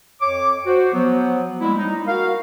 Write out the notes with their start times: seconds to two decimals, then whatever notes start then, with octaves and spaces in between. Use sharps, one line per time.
0.21 F2 C#5 D6
0.65 F#4 C5
0.93 F3 F#3 B3
1.60 G3 G#3 A#3 E4
1.76 D#4
2.06 F#4 A#4 F5